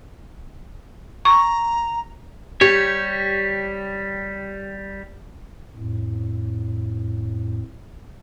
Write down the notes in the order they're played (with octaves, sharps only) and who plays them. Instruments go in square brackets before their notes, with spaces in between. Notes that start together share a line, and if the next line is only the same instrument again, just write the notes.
[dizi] A#5 [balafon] C#6
[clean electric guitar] G3 C#5 [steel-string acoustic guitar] G4
[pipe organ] F2 A2